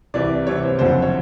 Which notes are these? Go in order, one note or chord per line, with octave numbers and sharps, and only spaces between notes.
C2 C3 E3 D5
C2 C3 E3 C#5
C5
F#1 F2 D3 C5
C#5